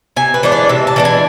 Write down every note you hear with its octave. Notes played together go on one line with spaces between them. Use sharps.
C3 G#5
B4
E3 G#3 D4 C5
D5
C3 E5
A5
E3 G#3 D4
G#5